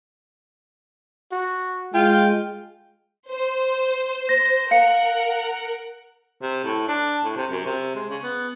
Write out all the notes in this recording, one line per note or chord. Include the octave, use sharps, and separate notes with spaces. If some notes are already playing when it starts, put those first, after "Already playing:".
F#4
G#3 F4 G5
C5
A#6
A#4 F5 F#5 C#7
C3
A2
D4
A2
C3
F#2
C3
G#3
C#3
B3